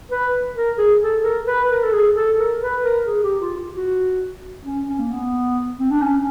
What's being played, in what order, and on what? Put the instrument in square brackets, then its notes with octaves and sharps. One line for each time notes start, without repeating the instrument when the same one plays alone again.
[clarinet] B4
A#4
G#4
A4
A#4
B4
A#4
A4
G#4
A4
A#4
B4
A#4
G#4
G4
F4
F4
F#4
C#4
C#4
A#3
B3
C4
D4
C#4